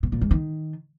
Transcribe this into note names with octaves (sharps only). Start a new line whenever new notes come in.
B2
A#2
G#2
D#3